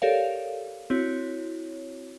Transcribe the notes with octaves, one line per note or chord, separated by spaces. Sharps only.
G4 A4 A#4 C#5 D5 F5
C4 E4 F#4 C#5